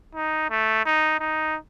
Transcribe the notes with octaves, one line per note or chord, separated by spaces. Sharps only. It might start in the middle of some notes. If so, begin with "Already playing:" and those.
D#4
A3
D#4
D#4